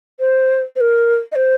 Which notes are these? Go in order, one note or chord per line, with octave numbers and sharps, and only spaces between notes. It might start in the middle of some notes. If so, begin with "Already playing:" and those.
C5
C5
A#4
D#5
C5